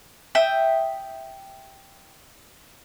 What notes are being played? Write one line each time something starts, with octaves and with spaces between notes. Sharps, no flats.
E5 G5 D#6